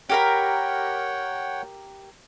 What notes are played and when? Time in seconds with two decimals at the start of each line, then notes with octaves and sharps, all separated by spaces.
0.10 G4 A#4 C#5 F#5 G5 B5